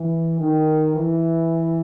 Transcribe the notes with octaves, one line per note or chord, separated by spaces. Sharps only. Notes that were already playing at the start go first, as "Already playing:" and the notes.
Already playing: E3
D#3
E3